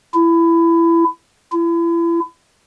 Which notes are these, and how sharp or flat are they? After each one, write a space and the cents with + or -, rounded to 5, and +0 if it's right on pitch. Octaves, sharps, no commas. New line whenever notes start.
E4 +20
E4 +35